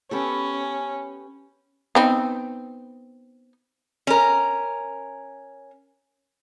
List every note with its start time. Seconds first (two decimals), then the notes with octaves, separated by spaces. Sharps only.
0.11 B3 C#4 G4 A4
1.95 B3 C4 D#4
4.07 C#4 A#4